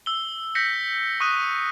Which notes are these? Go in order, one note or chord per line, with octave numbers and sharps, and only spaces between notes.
E6 G7
G6 A#6 B6 C#7
C#6 D#6 F#6 D#7